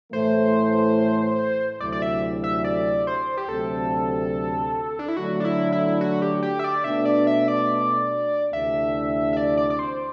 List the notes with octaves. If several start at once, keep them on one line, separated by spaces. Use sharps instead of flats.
A2 E3 A3 C5
D2 C3 F#3 A3 E4 D5
D5
E5
E5
D5
C5
G4
D2 C3 F#3 A3 C4 A4
D4
E4
D3 F#3 A3 F#4
D4
E4
E4
F#4
G4
G4
E5
D5
B2 A3 D4 E5
D5
E5
D5
D2 C3 E3 A3 D4 E5
E5
D5
D5
D5
C5